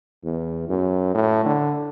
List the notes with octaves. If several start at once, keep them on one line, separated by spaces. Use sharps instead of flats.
E2
F#2
A2
D3